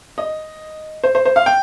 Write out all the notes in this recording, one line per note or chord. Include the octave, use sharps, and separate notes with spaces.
D#5
C5
C5
C5
F5
G5